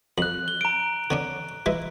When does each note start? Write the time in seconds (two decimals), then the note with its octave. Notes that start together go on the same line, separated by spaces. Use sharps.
0.18 F2 F#6 F#7
0.48 G7
0.61 A#5 D7
1.11 D3 C#4 D4
1.66 E3 G#3 E5